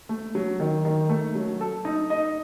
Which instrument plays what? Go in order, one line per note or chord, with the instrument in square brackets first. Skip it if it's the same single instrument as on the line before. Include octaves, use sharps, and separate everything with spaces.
[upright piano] A3
F#3
D#3
D#3
A3
F#3
A4
D#4
D#5